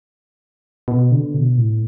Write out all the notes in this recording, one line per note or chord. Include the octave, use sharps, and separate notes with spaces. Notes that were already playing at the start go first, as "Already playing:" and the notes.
B2
D3
B2
A2